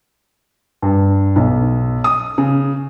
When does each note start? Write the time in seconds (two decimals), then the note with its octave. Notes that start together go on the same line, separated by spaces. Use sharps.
0.82 G2
1.36 B1
2.04 D#6
2.38 C#3